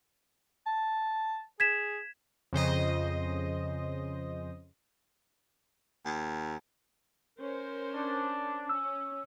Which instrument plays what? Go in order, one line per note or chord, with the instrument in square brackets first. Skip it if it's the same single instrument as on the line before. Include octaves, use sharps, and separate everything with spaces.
[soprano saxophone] A5
[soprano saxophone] G#4 [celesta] G#6 B6 E7
[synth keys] F2 C#3 C5 D#5
[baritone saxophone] D#2
[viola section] C#4 A#4 C5
[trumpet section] D4
[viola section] C#4 [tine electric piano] E6